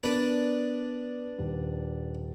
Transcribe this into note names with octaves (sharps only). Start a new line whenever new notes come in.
B3 D4 A#4 B4
D#1